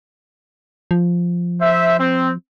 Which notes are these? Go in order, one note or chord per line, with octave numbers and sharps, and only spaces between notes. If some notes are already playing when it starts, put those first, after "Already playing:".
F3
C5 E5
C4